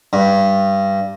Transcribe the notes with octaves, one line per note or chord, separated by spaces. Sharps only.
G2